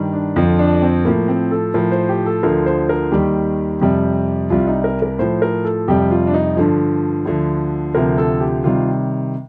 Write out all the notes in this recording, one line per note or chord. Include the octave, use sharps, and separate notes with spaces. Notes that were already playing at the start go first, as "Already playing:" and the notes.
Already playing: G2 D#3 G3
D4
F2 D3 F3 F4
D4
C4
A2 F3 A#3
C4
A4
A2 F3 A#4
C5
G4
A4
D2 D3 F3 A#4
C5
A#4
D#2 D#3 G3 G4
F2 C3 G3
C2 C3 G3 F4
D#4
A#4
A#4
A2 F3 C5
A#4
A4
F2 C3 G3 G4
F4
D4
D#4
G2 D3 F3
D2 D3 F3
D2 C3 F3 A#4
A4
G4
C3 D#3 G3 F4